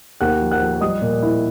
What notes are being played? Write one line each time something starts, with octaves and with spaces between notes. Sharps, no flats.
D#2 F#5 F#6
F3
F#5 F#6
F3
G3 D#5 D#6
A#2
E4